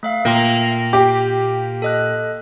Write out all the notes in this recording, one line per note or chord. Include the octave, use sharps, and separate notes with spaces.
A3 E5 F5
A#2 A#3 G5 C6
G4 D6
A4 D#5 F#6